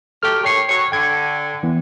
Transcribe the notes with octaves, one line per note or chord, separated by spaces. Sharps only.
F#3 A3 G4 A4 F6
D#2 A3 C#5 G5 C7
F#3 C#5
D3 G5 G#6
E3 B3